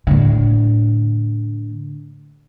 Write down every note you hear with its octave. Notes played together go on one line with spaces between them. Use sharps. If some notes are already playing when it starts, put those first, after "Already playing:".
A2 D3